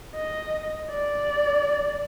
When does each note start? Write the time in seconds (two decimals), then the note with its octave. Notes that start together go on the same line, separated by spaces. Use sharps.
0.16 D#5
0.91 D5